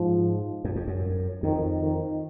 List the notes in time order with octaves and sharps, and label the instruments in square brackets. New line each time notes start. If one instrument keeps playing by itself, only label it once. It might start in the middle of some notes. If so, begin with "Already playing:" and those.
Already playing: [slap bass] G#2 [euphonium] F3
[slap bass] F#2
F2
F#2
[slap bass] F2 [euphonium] D#3
[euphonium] D#3